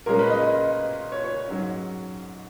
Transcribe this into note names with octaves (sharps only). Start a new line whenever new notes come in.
A#2 G#3 C#4 A#4
B4
D#5
D#5
C#5
C#5
G#2 F#3 C#4